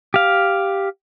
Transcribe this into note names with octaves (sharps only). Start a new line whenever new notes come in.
G4 F5